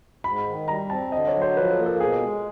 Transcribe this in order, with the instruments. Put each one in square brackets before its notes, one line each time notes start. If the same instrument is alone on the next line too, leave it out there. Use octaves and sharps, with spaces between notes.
[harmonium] G#2 [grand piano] B5
[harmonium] D#3
[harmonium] G3 [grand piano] A#5
[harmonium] C4 [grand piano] A5
[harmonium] D3 [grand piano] D#5
[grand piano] C#5
[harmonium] F#3
[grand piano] C5
[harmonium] F3 [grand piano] B4
[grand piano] A4
[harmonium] A#3
[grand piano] A4
[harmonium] B2 [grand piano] G#4
[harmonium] G#3